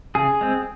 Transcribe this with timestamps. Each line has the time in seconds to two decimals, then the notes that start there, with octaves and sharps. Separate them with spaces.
0.15 C#3 G#4
0.41 G#3 C4